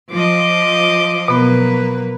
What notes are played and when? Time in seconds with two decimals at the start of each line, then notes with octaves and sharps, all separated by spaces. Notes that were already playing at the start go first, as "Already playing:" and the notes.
0.12 F3 D#5 D6
1.28 B2 F#3 A#3 B3 B4